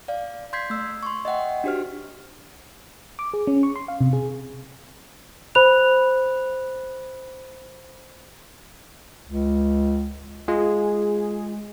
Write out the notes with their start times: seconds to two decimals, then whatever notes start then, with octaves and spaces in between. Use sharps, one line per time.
0.08 D5 F5
0.53 C6 G6 G#6 B6 C7
0.70 A3 E6
1.03 C6 C#6
1.25 D#5 E5 F#5 G5
1.64 D4 F#4 G4 C5 F6
3.19 D6
3.34 G#4
3.47 C#4
3.63 C#6
3.76 C6
3.88 F5
4.01 C3
4.13 G#4
5.55 C5 B5 F#6 F7
9.25 C#2
10.48 G#3 F4 G#4